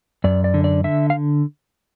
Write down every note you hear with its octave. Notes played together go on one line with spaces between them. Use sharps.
F#2 D5
D5
D3
D5
D3 E5
F5